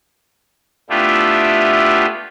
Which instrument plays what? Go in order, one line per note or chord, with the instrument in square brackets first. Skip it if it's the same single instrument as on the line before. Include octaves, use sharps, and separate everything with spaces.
[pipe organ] A3 B3 D4 E4 F4 G4